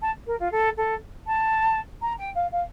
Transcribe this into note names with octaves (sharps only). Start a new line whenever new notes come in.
A5
A#4
F4
A4
A4
A5
A#5
G5
F5
F5